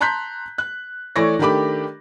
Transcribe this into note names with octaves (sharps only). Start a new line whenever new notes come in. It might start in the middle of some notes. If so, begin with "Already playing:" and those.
A5 A#5 C6 F#6 G6 B6
F#6
E3 A3 C#5 D5 C#6 A#6
D#3 A3 D4 G4 B5 D6